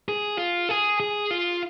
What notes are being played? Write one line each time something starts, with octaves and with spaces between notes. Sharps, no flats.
G#4
F4
G#4
G#4
F4